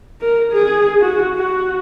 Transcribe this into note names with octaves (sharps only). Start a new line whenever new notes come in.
A#4
G#4
F#4
F#4